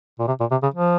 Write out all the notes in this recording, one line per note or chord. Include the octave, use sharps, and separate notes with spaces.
A#2
C3
A#2
C3
C#3
F3